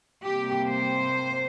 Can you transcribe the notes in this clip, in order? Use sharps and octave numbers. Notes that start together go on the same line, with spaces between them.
C3 G3 A#3 G4
C5